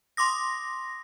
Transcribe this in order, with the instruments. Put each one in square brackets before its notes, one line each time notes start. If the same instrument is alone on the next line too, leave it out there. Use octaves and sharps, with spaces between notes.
[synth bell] C6 D6 D#6 A#6